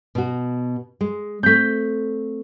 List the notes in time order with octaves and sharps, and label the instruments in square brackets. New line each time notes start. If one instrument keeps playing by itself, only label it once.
[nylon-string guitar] B2 F#4
G#3
[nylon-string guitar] A3 C4 [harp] G6 B6